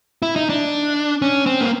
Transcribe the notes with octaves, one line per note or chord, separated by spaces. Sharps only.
E4
D#4
D4
C#4
C4
A#3